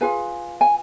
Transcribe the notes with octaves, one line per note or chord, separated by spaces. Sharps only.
F4 G#4 B4 G#5
G#5